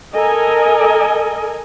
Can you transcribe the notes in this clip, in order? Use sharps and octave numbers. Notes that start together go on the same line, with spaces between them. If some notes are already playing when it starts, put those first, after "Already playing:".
A4 A#4 D#5 G#5